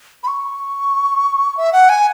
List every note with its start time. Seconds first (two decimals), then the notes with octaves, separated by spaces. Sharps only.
0.23 B5
0.27 C#6
1.57 E5
1.73 F#5
1.89 G#5